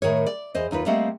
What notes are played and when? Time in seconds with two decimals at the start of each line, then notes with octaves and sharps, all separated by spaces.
0.02 A2 D#3 A#4 C#5
0.26 D5
0.54 E2 C5 D#5
0.71 D#2 D#4 F4 B4
0.86 G3 A3 A#3 C4 D#5 F#5